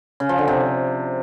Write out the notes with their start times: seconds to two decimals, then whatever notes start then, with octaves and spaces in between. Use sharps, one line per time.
0.20 C#3
0.29 F3
0.38 D3
0.48 C3